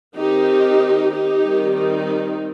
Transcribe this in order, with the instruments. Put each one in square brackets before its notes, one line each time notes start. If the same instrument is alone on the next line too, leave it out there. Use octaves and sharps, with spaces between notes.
[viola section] D#3 C4 D#4 G4
D#4 G4
D#3 G3 C4
D#4